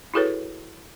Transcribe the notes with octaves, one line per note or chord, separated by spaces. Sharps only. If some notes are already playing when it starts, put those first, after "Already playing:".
E4 F#4 G#4 A4 B4 C#5